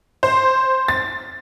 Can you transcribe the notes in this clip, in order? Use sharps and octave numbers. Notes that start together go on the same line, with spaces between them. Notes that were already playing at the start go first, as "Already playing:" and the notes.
C5
A6